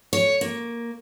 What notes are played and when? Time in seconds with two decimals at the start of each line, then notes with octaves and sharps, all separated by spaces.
0.13 C#5
0.41 A#3